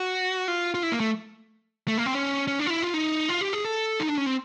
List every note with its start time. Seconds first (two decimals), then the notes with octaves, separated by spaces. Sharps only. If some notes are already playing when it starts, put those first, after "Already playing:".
Already playing: F#4
0.48 F4
0.74 F4
0.83 E4
0.92 A#3
1.00 A3
1.88 A3
1.98 A#3
2.06 C4
2.15 C#4
2.48 C#4
2.59 D4
2.66 F4
2.70 E4
2.82 F4
2.94 D#4
3.29 F4
3.41 G4
3.53 G#4
3.65 A4
4.00 D#4
4.09 D4
4.17 C#4
4.26 C4